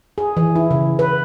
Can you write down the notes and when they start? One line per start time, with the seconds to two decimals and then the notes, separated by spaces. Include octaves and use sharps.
0.18 G#4
0.37 E3
0.56 E4
0.71 C#3
0.99 B4